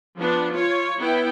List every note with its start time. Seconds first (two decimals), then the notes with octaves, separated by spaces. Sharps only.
0.18 F3 B3 D4
0.55 F4 C#5
0.99 B3 E4 G5